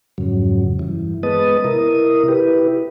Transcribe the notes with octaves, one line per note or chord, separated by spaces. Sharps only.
F2 G#2 C#3 F#3
G2 E3
G#3 B3 B4 D#5 A5 D#6
C3 E4 A#4 D#6
E4 G4 B4